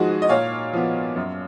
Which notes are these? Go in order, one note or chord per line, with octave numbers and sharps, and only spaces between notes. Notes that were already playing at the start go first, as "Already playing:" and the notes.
Already playing: G#2 F3 G#3 F#4
D#5
A#2 C#5 F5
F3 B3
F#2